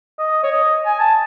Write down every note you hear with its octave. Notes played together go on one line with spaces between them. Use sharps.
D#5
C#5
D#5
G#5
A5